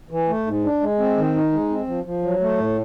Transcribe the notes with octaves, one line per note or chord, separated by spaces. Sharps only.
E3
A3
G#2
D4
G#3
C4
D#3
D#4
G#3
C4
F3
F3
F#3
A3
A2